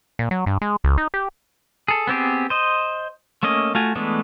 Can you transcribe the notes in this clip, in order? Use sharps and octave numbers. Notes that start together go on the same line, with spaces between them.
A#2
F#3
G2
G#3
C#2
D#4
G4
G#4 A4
B3 C4 G4 G#4
C5 D#5
A3 A#3 C#4 D#5
A3 F4 F#4 G#5
E3 G#3 A3 B3 D4